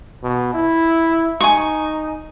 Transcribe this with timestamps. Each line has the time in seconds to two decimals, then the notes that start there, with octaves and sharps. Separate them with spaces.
0.23 B2
0.54 E4
1.41 D#4 G#5 C#6